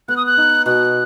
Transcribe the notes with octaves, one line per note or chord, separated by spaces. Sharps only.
B3 F#6
D#6
F#6
D#4
B2 F#6